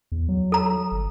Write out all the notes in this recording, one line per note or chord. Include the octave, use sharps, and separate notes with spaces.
E2
F#3
A4 A#5
G1